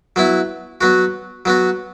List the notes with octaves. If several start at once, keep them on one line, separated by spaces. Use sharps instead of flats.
F#3 B3 E4
F#3 B3 F#4
F#3 B3 F#4